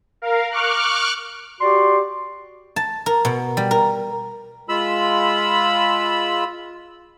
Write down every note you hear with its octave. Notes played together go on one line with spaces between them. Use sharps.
A#4 F5
C#6 D6 F6 F#6
F#4 G4 D5 C6
A5
A#4
B2
G3
A#4
G#3 F4 B5 E6